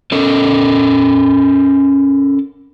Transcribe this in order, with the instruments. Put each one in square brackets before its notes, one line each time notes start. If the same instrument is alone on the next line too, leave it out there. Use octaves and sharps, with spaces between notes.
[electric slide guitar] C#4 A4 A#4